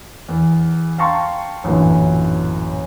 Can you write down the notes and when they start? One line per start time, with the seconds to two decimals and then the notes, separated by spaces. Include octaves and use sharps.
0.28 E2
0.98 F5 G5 A5 A#5 C6 C#6
1.64 A1 F#2 A#2 D3 E3